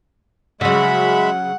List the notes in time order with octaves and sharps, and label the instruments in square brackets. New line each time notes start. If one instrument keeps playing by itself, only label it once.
[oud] C#3 F#3 [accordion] G#3 E5 B5 [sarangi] F#5